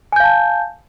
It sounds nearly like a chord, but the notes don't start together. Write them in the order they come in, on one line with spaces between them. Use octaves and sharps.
G#5 G6 F5 A5